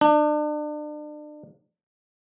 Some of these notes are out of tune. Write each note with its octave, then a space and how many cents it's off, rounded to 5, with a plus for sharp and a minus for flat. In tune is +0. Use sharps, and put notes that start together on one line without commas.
D4 +35